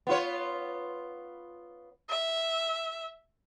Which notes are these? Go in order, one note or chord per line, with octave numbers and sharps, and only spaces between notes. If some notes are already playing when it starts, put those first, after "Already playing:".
B3 F4 C#5
E5